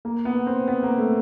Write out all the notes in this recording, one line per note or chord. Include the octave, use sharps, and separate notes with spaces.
A#3
B3
C4
B3
A#3
A3